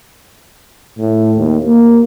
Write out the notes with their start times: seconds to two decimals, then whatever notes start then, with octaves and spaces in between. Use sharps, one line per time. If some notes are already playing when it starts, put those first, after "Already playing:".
0.99 A2
1.37 D#2
1.65 A#3